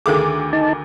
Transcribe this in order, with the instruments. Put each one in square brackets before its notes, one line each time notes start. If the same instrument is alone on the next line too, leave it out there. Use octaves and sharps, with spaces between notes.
[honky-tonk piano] D2 D#3 D6 [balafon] G#4 A4
[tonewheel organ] D#4 A5